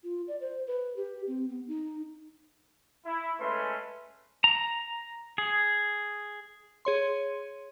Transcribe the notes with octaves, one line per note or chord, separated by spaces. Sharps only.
F4
D5
C5
B4
G4
C4
B3
D#4
E4
G#3 A3 C#4 B4 C6
A#5
G#4
G#4 C#5 C6